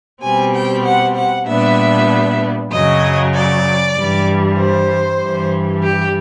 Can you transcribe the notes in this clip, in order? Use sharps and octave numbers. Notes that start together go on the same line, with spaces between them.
B2 G3 C4 G#5
G5
F#5
F#5
A#2 G3 B3 D4 E5
F#2 C#3 F#3 D#5
D5
G2 E3 G3
C5
G2 E3 G3
G4